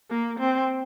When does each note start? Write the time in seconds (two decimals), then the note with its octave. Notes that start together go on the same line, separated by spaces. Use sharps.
0.10 A#3
0.39 C4